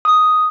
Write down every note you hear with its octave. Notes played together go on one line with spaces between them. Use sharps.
D#6